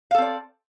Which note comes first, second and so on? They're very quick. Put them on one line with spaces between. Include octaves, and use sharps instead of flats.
F5 A4 C4 D5